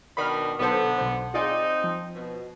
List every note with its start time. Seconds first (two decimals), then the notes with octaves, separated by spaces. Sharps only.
0.17 B2 D#3 D4 B5 F6
0.60 B1 D3 B3 A4 C5
0.98 B1 C5
1.34 C4 D#4 F4 G#4 D5
1.84 F3
2.15 B2